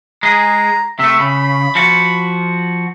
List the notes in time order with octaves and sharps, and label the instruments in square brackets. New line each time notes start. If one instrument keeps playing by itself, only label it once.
[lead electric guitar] G#3 G#4 [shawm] A#5
[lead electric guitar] C3 A3 [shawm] E5
[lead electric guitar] C#3 [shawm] B5
[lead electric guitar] F3 F#4